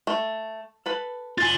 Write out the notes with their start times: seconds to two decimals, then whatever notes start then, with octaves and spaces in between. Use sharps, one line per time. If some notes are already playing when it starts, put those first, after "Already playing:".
0.07 A3
0.86 A4 B4 B5
1.38 F4 G#5 A6